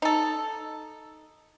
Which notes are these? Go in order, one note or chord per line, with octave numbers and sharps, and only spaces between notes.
D#4 A4